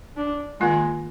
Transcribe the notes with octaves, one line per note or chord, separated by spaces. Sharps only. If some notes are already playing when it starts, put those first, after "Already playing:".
D4
D#3 G#3 A#3 F4